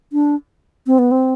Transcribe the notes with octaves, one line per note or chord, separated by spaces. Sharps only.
D4
C4
B3
C4